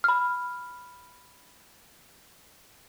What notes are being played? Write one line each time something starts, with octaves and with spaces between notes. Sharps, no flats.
B5 F6